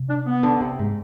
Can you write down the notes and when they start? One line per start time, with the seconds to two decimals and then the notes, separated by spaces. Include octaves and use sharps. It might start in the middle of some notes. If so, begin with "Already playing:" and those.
Already playing: C3
0.09 D4
0.26 B3
0.43 D3
0.60 C3
0.79 G#2